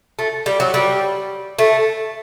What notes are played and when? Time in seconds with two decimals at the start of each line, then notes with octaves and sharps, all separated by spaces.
0.19 A3
0.46 G3
0.60 F#3
0.74 G3
1.59 A3